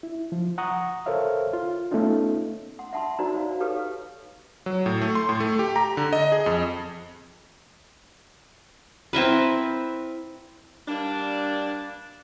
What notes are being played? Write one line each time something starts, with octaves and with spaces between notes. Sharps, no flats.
E4
F3
F#5 A#5 C#6 D#6
A4 A#4 C5 C#5 E5 F5
F4
A3 B3 C#4 D#4 F4
F#5 C6
E5 F#5 A5 B5 C6
D#4 F#4 A#4 C5 D5 A#5
C5 C#5 F5
D#4 G4 A4 B4 C#5 F5
F#3
A2
A3
C6
A2
A3
G4
A#5
D3
D#5
G#4
F2
C4 E4 A#4 B4
G3 A#3 D4